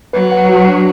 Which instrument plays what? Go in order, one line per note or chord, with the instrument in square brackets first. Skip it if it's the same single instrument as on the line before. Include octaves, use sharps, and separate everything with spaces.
[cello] F#3 [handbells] B4
[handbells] F#5
F#4
D4